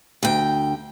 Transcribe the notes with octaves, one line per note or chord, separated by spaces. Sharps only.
D2 G5